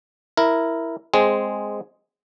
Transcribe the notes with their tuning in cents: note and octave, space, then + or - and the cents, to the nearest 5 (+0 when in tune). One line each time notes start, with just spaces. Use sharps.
E4 +0 A#4 +0
G#3 -5 C4 +0 G#4 +0